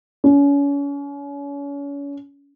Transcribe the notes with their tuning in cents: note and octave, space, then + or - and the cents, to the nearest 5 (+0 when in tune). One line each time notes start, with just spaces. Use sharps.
C#4 +35